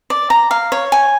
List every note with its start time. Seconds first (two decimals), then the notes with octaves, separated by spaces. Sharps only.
0.10 D5
0.30 A#5
0.51 F5
0.72 C#5
0.92 G#5